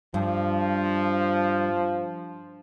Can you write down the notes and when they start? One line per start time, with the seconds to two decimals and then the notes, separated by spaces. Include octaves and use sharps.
0.14 G2 F3